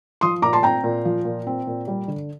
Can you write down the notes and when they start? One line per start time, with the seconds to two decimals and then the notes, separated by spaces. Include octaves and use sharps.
0.21 F3 C6 D#6
0.42 A#2 A#5 D6
0.53 A5 C6
0.63 C4 G5 A#5
0.84 A#2
1.05 F3
1.25 A#2
1.47 C4
1.67 A#2
1.88 G3
2.08 D3